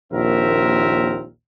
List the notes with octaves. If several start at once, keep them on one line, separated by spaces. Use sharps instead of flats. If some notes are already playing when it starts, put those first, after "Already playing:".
A#1 D#2 C4 A#4 E5